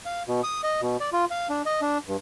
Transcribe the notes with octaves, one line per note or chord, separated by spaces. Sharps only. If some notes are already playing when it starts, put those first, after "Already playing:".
F5
B2
D#6
D#5
B2
D5
F4
F5
D4
D#5
D4
G2